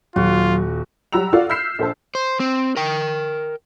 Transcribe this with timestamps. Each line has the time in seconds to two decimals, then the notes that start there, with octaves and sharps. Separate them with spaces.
0.16 D#1 F#3 F4 F#4
1.13 F#3 G3 F#4 A#5 E6 F7
1.33 F4 F#4 A4 D5 F5
1.50 E6 F6 G6 B6 C7 E7
1.79 A#1 A4 C5 A5
2.15 C5
2.40 C4
2.76 A#4 G5